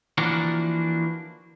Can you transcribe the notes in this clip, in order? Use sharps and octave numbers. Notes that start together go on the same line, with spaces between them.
E3 F3 A#3 D4 F#4 A#4